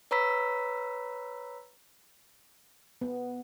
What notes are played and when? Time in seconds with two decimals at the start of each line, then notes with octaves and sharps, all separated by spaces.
0.11 B4 C#5 A#5 B5 E6 B6
3.01 B3